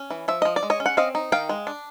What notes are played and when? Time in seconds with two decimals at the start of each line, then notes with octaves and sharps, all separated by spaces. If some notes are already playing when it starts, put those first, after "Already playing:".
Already playing: C#4
0.10 E3
0.28 F3 E5
0.42 F3 D#5
0.56 D5
0.63 G#3
0.70 C#5 D#5
0.80 C#4
0.86 F#5
0.97 C4 D#5 F5
1.15 D#4
1.32 D#3 F5 G5
1.49 G#3
1.67 D4